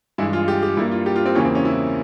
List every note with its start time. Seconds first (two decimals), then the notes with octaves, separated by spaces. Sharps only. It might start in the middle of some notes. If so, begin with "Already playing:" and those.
0.18 G2 E3 G#3 E4
0.33 F4
0.48 G4
0.62 G4
0.77 G2 G3 A#3 E4
0.91 F4
1.06 G4
1.16 F4
1.26 C4
1.35 E2 C#3 E3 A#3 C#4
1.45 C4
1.55 C#4
1.65 E4